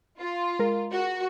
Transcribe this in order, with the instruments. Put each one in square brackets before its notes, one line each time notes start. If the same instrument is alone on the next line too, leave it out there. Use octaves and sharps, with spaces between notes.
[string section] F4
[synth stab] G#3 A#4
[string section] F#4